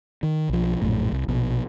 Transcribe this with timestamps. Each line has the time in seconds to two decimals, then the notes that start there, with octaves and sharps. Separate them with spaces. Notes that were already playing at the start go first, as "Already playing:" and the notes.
0.23 D#3
0.49 B1 F3
0.82 A#1 F#2 A2
1.12 C2
1.28 A#1 B2